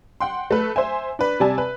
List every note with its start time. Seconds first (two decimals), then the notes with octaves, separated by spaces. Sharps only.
0.20 F#5 G5 C6
0.51 A3 B4
0.76 C5 E5 G#5
1.19 D4 B4
1.40 C3 G3 D5 G#5 A5
1.58 B4